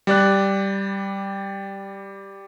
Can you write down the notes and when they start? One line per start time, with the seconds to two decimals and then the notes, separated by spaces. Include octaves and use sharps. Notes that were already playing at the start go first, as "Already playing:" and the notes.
0.07 G3 D5 F#6